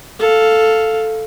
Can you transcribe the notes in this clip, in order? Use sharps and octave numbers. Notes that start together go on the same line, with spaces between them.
A4 F5